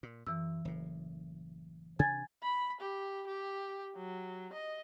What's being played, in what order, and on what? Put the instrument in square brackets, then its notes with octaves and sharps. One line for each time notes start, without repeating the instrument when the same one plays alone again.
[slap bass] A#2
[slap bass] F#2 [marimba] E3 E6
[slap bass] F#1 A2
[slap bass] C3 D4 [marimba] G#5 G#6 A6
[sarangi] B5
G4
G4
F#3
D#5